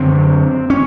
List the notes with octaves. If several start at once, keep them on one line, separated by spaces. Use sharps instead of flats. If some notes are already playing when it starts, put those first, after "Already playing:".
Already playing: F#2 D3 C4
C#4